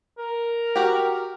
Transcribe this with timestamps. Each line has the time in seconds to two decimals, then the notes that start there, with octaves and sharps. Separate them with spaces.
0.18 A#4
0.76 F#4 G4